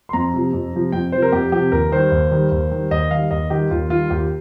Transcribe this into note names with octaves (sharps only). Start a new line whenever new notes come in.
C6
F2 A#5
C3 F3
F2
C3 F3
F2 G5
C3 F3 C5
A#4
F2 G4
C3 F3 G4
D#2 A#4
D#3 G3 C5
D#2
D#3 G3
D#2
D#3 G3
D#2 D#5
D#3 G3 F5
D#2 D#5
D#3 G3 G4
D#2 F4
D#3 G3 F4
D#2 G4